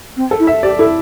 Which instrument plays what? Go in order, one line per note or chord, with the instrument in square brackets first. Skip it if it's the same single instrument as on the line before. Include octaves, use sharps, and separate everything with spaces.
[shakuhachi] C4
[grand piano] A4
[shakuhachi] E4
[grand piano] E5
[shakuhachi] G4 [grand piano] D5
[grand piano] E4 [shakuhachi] A4